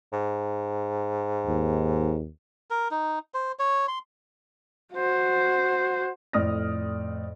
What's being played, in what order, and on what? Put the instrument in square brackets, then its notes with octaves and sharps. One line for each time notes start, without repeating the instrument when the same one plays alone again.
[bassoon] G#2
[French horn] D#2
[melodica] A#4
D#4
C5
C#5
C6
[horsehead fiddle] F#4 C5
[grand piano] F2 A2 D5 D#6 F6 A#6